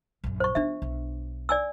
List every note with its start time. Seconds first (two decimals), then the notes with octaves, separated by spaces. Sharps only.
0.24 A#1 F#2
0.40 C5 C#6
0.55 B3 D4 F4 E5
0.82 B1
1.49 D5 G#5 E6